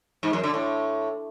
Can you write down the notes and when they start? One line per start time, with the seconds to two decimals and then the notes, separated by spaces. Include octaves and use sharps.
0.23 G#2
0.33 F#2
0.43 D3
0.54 A2